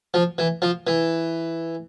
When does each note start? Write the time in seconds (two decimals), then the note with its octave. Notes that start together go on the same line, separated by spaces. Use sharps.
0.14 F3
0.38 E3
0.62 F3
0.87 E3